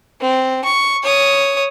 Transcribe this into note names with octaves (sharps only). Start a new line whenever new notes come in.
C4
C#6
C#5 D#6